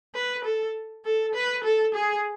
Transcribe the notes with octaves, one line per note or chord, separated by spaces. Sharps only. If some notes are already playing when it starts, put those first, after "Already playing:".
B4
A4
A4
B4
A4
G#4